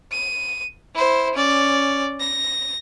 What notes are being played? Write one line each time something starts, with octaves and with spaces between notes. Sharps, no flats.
D#7
E4 C5
C#4 D5
A#6